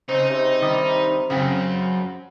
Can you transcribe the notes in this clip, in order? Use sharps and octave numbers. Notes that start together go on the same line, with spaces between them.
C#3 C4 D#4
C3
D#3 G3
F#2 C#3 F#3 C4